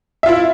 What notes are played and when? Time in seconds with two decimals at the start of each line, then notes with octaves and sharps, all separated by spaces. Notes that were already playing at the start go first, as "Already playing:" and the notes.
0.23 E5
0.26 F4
0.29 E4